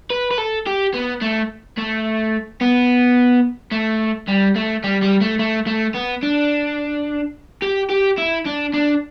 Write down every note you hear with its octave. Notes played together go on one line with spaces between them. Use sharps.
B4
B4
A4
G4
B3
A3
A3
B3
A3
G3
A3
G3
G3
A3
A3
A3
B3
D4
G4
G4
E4
D4
D4